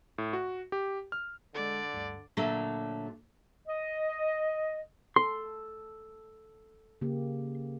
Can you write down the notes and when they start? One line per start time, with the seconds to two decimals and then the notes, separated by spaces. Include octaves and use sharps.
0.18 A2
0.33 F#4
0.72 G4
1.12 F6
1.55 D3 G#3 A4 D5
1.94 D2 G2
2.37 A#2 D3 F#3 A3
3.67 D#5
5.16 A4 C6
7.01 C#3 A#3 G4